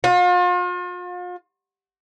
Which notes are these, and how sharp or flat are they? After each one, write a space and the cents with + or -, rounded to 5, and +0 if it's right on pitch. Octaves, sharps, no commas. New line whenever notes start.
F4 +40